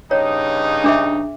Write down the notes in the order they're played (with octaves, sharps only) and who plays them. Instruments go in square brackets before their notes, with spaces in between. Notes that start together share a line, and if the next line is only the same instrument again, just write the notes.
[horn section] G2 C#3 D#4 [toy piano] C#5
[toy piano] D4 G#4 E5